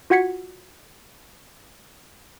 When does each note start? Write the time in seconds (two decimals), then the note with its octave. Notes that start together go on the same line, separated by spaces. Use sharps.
0.10 F4 F#4 F#5 G#6 B6 C#7